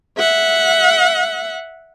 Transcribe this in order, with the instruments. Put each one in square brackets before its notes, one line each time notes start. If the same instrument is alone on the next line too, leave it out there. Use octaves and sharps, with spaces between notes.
[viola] E5 F#5